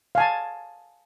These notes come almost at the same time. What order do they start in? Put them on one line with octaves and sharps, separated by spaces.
F5 G#5 A5